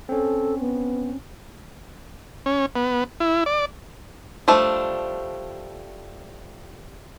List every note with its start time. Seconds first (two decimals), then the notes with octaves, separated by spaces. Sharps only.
0.09 C4 C#4 A4
0.60 B3
2.46 C#4
2.76 B3
3.20 E4
3.46 D5
4.48 F3 G3 A3 D4